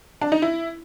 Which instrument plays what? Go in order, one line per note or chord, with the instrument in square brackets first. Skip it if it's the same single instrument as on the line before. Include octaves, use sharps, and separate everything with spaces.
[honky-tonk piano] D4
D#4
E4